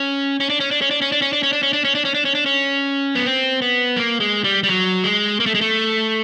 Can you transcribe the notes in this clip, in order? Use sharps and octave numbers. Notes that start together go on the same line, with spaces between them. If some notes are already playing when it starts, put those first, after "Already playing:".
Already playing: C#4
C#4
D4
C#4
D4
C#4
D4
C#4
D4
C#4
D4
C#4
D4
C#4
D4
C#4
D4
C#4
D4
C#4
D4
C#4
B3
C4
B3
A#3
G#3
G3
G3
F#3
G#3
A#3
A3
G#3
A3